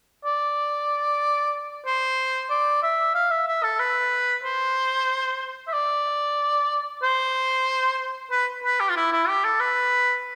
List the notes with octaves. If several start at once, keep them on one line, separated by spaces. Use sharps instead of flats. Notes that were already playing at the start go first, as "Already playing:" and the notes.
D5
C5
D5
E5
F5
E5
E5
A4
B4
C5
E5
D5
C5
B4
B4
G4
F4
E4
E4
G4
A4
B4